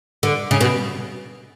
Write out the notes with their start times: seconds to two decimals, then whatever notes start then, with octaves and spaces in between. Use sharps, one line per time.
0.23 D3
0.51 C#3
0.61 B2